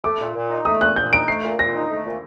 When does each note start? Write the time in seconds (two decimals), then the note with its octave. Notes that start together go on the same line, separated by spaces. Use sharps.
0.04 A3 D6
0.20 A#2
0.34 A#2
0.50 D#4
0.65 A3 D#6
0.81 A#2 F#6
0.96 A#2 G6
1.12 D#4 D7
1.28 A3 C7
1.43 A#2
1.59 A#2 A#6
1.74 D#4
1.90 A3
2.05 A#2